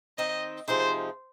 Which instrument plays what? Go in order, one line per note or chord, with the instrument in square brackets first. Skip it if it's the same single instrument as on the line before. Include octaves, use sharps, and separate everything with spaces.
[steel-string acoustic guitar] D#3 C4 D#4 [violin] D#5
[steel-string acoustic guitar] C3 F3 G#3 D#4 [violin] C5